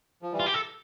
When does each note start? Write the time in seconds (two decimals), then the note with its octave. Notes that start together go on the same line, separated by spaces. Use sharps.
0.22 F3
0.33 E3 G3
0.40 F4
0.46 G4
0.54 A4